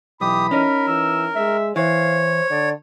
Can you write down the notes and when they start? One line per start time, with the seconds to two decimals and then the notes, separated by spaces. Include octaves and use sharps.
0.21 B1 E3 G4 B5 D#6
0.51 C#4 D#4 A#4
0.88 E3 E6
1.36 G#3 E5
1.76 E3 C5 C#5 F5
2.51 D3 D5